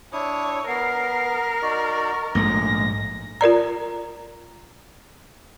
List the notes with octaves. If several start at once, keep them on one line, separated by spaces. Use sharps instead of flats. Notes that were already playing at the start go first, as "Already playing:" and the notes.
D4 E4 C#5 D#6
B3 A#4 C7
D#4 F#4 D5
A#1 G#2 G#3 A3 A#6
F4 A#4 D5 A#5